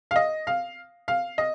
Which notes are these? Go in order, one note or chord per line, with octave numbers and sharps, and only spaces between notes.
F5
D#5
F5
F5
D#5